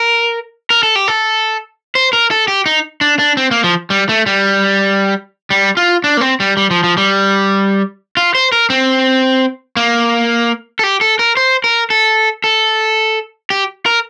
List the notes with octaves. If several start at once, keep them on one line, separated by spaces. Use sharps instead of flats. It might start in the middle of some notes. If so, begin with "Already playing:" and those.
Already playing: A#4
A#4
A4
G4
A4
C5
A#4
A4
G4
D#4
D4
D4
C4
A#3
F3
G3
A3
G3
G3
F4
D4
A#3
C4
G3
G3
F3
F3
G3
F4
C5
A#4
C4
A#3
A4
G4
A4
A#4
C5
A#4
A4
A4
G4
A#4